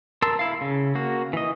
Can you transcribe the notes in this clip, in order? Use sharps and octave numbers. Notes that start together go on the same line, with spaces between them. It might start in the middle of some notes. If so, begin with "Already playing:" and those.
A#4 A5 C6 E6
E4 F5
C#3
A#3 F#4
E3 D#5